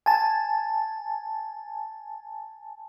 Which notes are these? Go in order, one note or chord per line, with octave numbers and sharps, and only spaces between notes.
G#5 A5